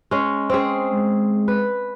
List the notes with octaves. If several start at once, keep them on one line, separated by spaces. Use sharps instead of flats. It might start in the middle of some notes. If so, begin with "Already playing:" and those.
G#3 C#4
C4 C#4 G#4
G#3
B4